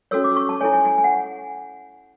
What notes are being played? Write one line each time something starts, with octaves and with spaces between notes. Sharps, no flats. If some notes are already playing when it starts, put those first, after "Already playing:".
C#4 F#4 A4 C#5 E6
D6
C#6
A5
E4 A4 C#5 G#5
G#5
G#5
G#5
F#5